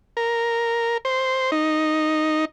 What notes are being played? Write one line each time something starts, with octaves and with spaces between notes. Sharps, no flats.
A#4
C5
D#4